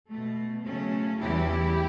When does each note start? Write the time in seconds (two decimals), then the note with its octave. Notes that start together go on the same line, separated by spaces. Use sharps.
0.10 B2 A3
0.65 C#3 F#3 A3 C#4
1.20 E2 C#3 E3 G3 E4 G4